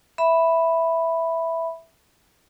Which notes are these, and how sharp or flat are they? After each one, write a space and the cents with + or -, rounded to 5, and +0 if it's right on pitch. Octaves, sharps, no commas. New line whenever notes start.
E5 +0 B5 +0